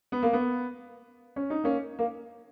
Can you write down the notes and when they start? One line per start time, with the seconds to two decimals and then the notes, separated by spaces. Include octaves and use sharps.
0.12 B3
0.23 A#3
0.33 B3
1.36 C#4
1.50 D#4
1.64 A#3 C#4
1.99 A#3